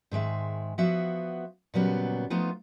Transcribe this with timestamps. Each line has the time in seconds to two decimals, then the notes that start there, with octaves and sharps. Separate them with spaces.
0.11 G#2 D#3 G#3 E5
0.78 F3 B3 F#4 E5
1.74 A#2 C#3 F#3 G3 B3
2.30 F3 A3 B3 D#4 F4